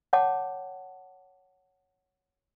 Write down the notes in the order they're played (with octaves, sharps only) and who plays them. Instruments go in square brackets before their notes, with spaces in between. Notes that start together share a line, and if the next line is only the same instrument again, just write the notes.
[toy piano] C#5 F#5 G5 A5 D6